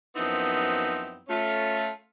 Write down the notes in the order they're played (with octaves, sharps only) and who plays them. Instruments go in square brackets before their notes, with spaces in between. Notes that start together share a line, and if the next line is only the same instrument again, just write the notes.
[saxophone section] F#2 F3 B3 C4 D#4 E4
A3 C#4 F4